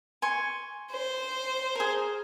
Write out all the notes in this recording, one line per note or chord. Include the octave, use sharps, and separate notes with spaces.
G#5 C6 C#6
C5
G#4 A#4